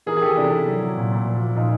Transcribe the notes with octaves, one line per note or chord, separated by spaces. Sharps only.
E3 G#4 A#4
G#4
E3 G4 A4
C3 D4 E4
C3
F#3
F#3
A#2
A#2
F3
F3
A#2 D#4 F4